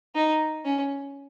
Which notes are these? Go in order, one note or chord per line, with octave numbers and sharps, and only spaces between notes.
D#4
C#4